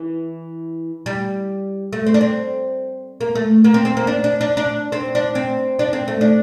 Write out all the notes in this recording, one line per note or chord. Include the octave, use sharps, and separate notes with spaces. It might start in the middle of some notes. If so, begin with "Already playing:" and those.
Already playing: E3
G3
A3
C4
D4
C4
A#3
A3
A#3
C4
C4
A#3
D4
D4
D4
D4
C4
D4
C4
D4
C4
A3
D4